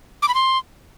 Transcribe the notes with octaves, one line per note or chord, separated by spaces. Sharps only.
D6
B5
C6